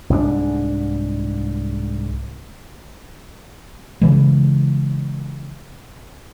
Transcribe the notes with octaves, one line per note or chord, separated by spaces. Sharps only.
C2 G#2 C4 D4
C#3 E3 G#3